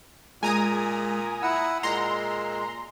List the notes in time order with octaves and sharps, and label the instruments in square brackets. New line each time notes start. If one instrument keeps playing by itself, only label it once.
[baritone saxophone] A#2 [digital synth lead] G#3 [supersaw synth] G#5 A#5 D#6
[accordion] E4 F#5 [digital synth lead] E6
[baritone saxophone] A#2 [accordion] G#3 [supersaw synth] A#5 C6